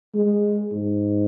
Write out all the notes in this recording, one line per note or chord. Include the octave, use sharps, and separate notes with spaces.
G#3
G#2